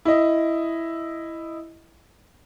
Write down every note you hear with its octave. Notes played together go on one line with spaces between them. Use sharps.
E4 D#5